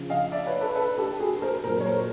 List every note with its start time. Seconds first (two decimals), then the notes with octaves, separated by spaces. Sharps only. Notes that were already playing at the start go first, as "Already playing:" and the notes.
Already playing: C#3 F3
0.10 D#5 F5
0.32 D5 E5
0.46 B4 C#5
0.61 A4 B4
0.76 A4 B4
0.98 G4 A4
1.20 F#4 G#4
1.42 A#4 C5
1.64 A#2 F#3 A#4 C5
1.80 C#5
1.86 A#4 C5